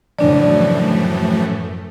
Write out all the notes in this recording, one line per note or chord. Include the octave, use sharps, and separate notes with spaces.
F#2 A2 C#3 E3 F3 A3 D4 D5